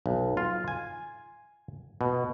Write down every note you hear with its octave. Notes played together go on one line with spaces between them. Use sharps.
B1
F4
G#5
B2